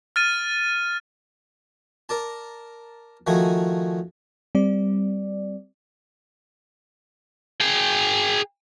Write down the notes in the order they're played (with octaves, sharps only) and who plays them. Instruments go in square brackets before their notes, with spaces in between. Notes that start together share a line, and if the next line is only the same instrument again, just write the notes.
[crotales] F6 A6 D#7
[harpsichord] A#4 D5 A5
D#3 F3 A3 F#4 G#4
[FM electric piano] G3 C4 D5
[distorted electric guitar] G#4 G5